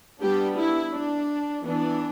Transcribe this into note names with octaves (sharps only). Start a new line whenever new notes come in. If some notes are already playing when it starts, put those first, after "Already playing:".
G3 B3 D4 G4
E4
D4
E3 B3 D4